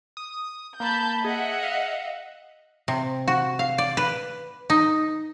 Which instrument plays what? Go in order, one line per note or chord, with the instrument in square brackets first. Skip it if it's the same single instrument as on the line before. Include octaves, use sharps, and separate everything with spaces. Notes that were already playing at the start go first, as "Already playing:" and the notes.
[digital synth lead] D#6
[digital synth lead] A#3 [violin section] A5 B5 G6
[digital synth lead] G#4 [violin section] D#5 E5 F#5
[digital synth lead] F5
[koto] C3
F#4
F5
D5
B4
D#4